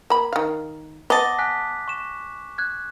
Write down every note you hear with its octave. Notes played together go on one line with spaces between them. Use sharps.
A#3 B5
D#3 F5
B3 D#5 A5 D6
G#5 F#6 B6
C#6 E7
F#6 G#6